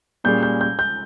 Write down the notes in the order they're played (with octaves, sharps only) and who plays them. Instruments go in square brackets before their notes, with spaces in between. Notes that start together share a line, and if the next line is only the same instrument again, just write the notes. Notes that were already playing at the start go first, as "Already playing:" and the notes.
[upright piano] A#2 G3 C#4 G#4 [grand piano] G6
[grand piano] G6
G6
G6